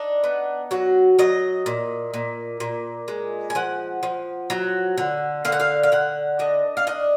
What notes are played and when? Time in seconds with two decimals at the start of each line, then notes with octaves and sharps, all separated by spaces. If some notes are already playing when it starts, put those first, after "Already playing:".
Already playing: D4 D#4
0.24 B3
0.71 F#3 F#4
1.19 F#3 D#5
1.66 A#2
2.14 A#2
2.60 A#2
3.08 G#3
3.50 G#5
3.55 F3 F#5
4.03 F3
4.50 F#3
4.98 D3
5.45 D3 F5
5.52 F#5
5.60 F5
5.83 F5
5.92 D3 F#5
6.39 D4 D#5
6.77 F5
6.87 D4 D#5